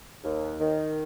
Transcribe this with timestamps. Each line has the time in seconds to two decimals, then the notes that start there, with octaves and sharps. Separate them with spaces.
0.24 D#2
0.61 D#3